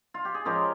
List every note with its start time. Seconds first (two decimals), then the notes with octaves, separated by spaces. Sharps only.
0.14 F4
0.25 G4
0.34 G#4
0.45 F3 G#3 C#4 G4 A#4